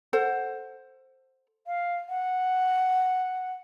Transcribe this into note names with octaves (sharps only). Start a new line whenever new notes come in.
A4 C5 F#5
F5
F#5